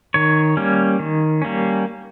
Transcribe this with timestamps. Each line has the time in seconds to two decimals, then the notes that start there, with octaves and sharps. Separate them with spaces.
0.14 D#3 C#5
0.57 G3 A#3 C#4
0.99 D#3
1.42 G3 A#3 C#4